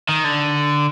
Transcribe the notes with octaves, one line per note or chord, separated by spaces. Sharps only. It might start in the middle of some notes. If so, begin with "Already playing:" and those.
D#3
D3